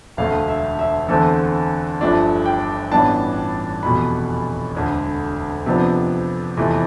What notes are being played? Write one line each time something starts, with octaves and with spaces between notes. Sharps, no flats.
E1 D2 D3 A3 F5
E5
E5
E2 D3 A3 C4 A4
G1 G2 F3 A3 D4
G5
A1 G2 E3 B3 D4 A5
F1 E2 B2 B5
E1 D2 D3
F2 C3 F3 B3 D4
F1 E2 C3 E3 A3